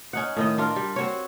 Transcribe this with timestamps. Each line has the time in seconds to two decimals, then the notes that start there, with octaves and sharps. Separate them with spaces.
0.13 C#4 D#4 F#5
0.37 A2 D#3 D#5
0.58 D4 F4 A#4
0.76 G3
0.96 C4 F#4 C#5